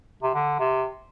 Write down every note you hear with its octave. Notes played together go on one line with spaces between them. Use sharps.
C3
D3
C3